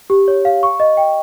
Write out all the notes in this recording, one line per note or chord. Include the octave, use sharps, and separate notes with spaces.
G4
C#5
F5
C#6
D#5
G5